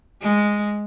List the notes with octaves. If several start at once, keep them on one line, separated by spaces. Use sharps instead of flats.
G#3